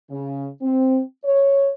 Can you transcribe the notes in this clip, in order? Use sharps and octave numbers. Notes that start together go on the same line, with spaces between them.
C#3
C4
C#5